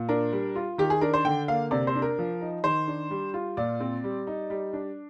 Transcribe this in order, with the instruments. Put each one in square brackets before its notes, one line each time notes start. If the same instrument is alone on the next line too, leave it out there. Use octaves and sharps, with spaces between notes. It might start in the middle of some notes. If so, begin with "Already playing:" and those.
Already playing: [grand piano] A#2
D4 A#4
G3
F4
D#3 G4
G#4
D4 A#4
C5
D3 G5
A#3 F5
C3 D5
C5
D4
A#4
F3
D#4
D#3 C5
D4
G3
F4
A#2 D5
C4
G3
D#4
G3
D4